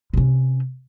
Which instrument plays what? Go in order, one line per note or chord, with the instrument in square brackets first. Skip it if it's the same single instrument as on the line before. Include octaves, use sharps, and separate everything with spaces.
[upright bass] C3 C#4